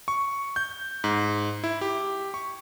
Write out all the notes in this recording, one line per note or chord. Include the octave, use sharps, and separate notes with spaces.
C#6
G6
G#2
E4
G4
C#6